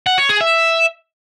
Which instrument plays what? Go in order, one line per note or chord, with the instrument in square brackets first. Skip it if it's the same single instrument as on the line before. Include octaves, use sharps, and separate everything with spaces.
[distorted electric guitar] F#5
C#5
G#4
E5